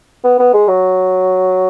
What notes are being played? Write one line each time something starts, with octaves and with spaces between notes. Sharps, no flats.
B3
B3
G#3
F#3